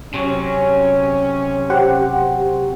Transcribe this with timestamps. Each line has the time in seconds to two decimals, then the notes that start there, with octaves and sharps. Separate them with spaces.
0.14 C3 F#3 C#4
1.70 G4 C5 F#5